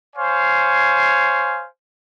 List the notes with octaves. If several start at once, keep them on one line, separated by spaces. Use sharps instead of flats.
C5 C#5 F5 G#5